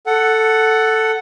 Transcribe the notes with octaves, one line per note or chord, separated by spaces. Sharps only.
A4 F#5